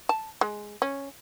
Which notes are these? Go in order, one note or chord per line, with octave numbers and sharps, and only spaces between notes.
A5
G#3
C#4